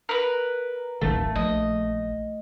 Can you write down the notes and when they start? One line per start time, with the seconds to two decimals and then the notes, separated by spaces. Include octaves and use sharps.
0.09 A#4 B4
1.01 D1 A1 D#3 A3
1.35 A#1 D#5